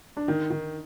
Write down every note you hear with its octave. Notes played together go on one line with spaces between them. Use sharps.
D4
D#3 D#4
D#3